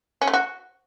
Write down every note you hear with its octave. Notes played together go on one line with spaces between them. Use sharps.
C#4
A3
F#4